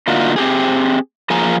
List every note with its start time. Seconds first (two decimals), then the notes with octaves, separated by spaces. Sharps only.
0.07 D3 A3 A#3 D#4 F4 F#4
0.36 C4 G4 G#4
1.30 F3 A#3 G#4 A#4 G#5 A#5